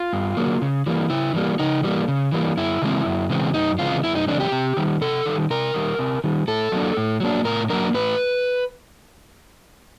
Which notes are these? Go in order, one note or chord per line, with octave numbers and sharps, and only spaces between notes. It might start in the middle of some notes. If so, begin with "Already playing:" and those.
Already playing: F4
G2
D3 F#3 A#3
C#3
E3 G3 A#3
C#3 E4
E3 G3 A#3
C#3 D#4
E3 G3 A#3
C#3
E3 G3 A#3
F#2 E4
C#3 E3 G#3 C4
F#2
C#3 E3 G#3 C4
F#2 D#4
C#3 E3 G#3 C4 F4
F#2 E4
D#4
C#3 E3 G#3 C4 D4
G4
C3
D#3 G3
C3 A4
D#3 G3
C3 A#4
D#3 G3
C3
D#3 G3
A2 A4
F#3 A#3 D4
A2
F#3 A#3 D4
A2 A#4
F#3 A#3 D4 A#4
A2 B4